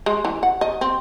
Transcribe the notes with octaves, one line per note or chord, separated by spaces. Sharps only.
G#3
E3
F#5
D#5
C4